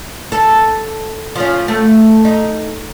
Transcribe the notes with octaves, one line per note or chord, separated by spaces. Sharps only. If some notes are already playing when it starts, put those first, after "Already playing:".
A4
F3 C#4
A3
D#4